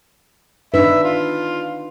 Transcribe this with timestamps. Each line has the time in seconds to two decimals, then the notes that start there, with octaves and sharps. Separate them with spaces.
0.74 D4 D#4 B4 E5
1.04 F4